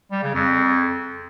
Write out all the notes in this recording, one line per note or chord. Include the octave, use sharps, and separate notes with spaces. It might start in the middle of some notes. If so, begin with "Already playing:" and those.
G3
C#3
F2